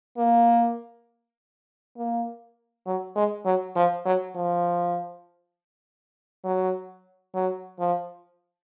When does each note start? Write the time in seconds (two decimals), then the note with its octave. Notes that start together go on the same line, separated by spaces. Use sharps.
0.17 A#3
1.97 A#3
2.86 F#3
3.15 G#3
3.45 F#3
3.76 F3
4.05 F#3
4.35 F3
6.44 F#3
7.34 F#3
7.79 F3